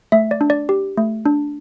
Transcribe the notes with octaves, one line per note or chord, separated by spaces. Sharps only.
A3 E5
D5
D4
D5
G4
A3
D4